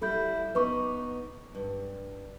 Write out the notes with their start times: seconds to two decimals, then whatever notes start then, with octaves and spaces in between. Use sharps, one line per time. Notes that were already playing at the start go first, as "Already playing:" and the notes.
0.01 G3 E4 F#4 A4 B5 G6
0.55 B3 D#4 B4 C#6 D6
1.55 G2